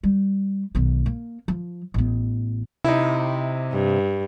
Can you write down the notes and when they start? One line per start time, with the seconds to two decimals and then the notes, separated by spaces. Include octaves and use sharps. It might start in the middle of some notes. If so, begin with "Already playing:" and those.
0.03 G3
0.75 B1 D#3
1.06 A#3
1.48 F3
1.94 A1 B3
2.84 C3 D#4 E4
3.72 G2